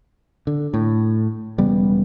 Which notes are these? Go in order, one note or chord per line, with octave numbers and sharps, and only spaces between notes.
D3
A2
E1 C#3 G3 B3